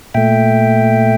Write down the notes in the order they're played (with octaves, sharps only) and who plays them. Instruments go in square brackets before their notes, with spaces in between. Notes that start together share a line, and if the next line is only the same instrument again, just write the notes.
[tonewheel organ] A#2 A3 E5 G5